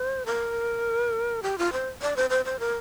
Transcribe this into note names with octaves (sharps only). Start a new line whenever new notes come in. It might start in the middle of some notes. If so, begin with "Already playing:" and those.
Already playing: C5
A#4
G4
F4
C5
D5
C5
C5
C5
A#4